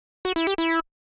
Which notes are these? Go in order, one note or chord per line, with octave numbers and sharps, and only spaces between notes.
F#4
E4
G4
E4